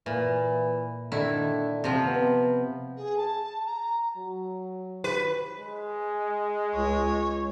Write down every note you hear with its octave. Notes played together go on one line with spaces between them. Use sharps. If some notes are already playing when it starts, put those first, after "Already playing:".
A#2 E3
D3 D#3 E4
C3 F3
B3
G#4
A5
A#5
F#3
B4
G#3
C#2 C#5